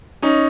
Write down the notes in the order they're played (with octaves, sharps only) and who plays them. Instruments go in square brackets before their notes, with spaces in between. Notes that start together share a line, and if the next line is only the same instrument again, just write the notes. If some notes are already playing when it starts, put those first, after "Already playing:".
[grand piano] C#4 D#4